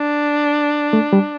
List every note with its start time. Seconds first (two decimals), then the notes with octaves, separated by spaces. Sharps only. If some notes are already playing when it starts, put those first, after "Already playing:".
Already playing: D4
0.93 A3
1.13 G3